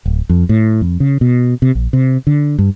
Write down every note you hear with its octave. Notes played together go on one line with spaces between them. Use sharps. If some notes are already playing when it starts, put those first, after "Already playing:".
D1
F2
A2
F2
C#3
B2
C3
A#1
C3
D3
G2